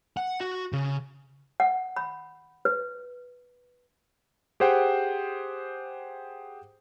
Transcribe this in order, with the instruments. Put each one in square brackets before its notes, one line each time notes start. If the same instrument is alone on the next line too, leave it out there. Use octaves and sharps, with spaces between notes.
[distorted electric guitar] F#5
F#4
C#3
[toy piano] F#5
B5
B4
[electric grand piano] G4 G#4 C5 F#5 G5